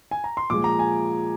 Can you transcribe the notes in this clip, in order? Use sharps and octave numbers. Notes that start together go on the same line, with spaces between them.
G#5
A#5
C6
A#2 F3 G#3 D6
A#5
G#5